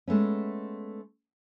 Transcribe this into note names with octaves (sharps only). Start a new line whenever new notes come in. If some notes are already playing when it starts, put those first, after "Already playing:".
G#3 A3 B3 C#4